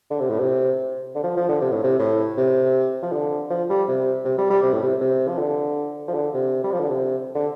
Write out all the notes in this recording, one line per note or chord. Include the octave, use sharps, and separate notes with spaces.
D3
C3
A2
C3
D3
F3
F3
D3
C3
A2
C3
A2
C3
F3
D3
F3
G3
C3
C3
G3
G3
C3
A2
C3
C3
F3
D3
F3
D3
C3
G3
F3
D3
C3
D3